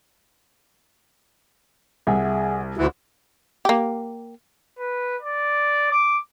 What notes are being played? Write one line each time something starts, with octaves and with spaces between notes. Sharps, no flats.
C2 G#4 E5 F#5 G#5
D2 E3
A#3 G4
B4
D5
D6